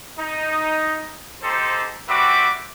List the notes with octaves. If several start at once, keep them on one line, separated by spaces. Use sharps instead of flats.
D#4
D#4 G4 A4 C5
G3 C4 F#4 B4 E5 D6